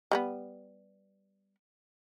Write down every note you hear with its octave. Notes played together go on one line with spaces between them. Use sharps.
G3 G#3 B3